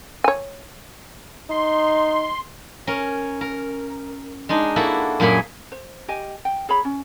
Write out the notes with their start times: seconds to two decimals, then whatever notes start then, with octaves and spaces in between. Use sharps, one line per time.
0.24 C#5 G#5
1.50 D#4 C6
2.87 C#4 A#4
3.41 A#4
4.49 G#3 D4 D#4
4.76 A#3 E4 F#4 A4
5.20 F#2 A#2 A#3 G#4 B5
5.72 C5
6.08 G4 D#5 G#5
6.45 G5
6.69 G#4 C#5 A#5 B5
6.85 C#4